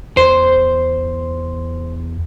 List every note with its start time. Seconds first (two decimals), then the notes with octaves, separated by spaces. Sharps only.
0.17 E2 C5